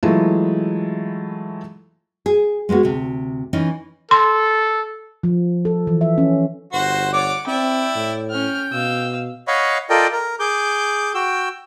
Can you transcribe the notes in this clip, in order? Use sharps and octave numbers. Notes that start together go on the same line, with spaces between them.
E3 F#3 G#3 A3 E4 F4
G#4
G#3 A#3 B3 F#4
D2 C3
E3 C#4 D#4
A4 C6
F3
A4
E3
E5
C#4
G1 F#4 C5 F#5
C#5 D5 F#5 D6
C4 E4 D5 G5
A2
C#4 G5 F6
B2 F5 E6
C#5 D#5 F5 F#5 B5 C#6
F4 A4 A#4 D5 D#5 G5
A#4
G#4 D6 G6
F#4 G5 E6